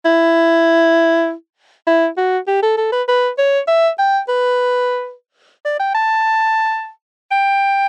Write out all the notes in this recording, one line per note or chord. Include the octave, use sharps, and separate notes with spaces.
E4
E4
F#4
G4
A4
A4
B4
B4
C#5
E5
G5
B4
D5
G5
A5
G5